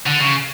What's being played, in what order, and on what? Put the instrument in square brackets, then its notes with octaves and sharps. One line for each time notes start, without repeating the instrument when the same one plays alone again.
[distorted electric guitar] D3
C#3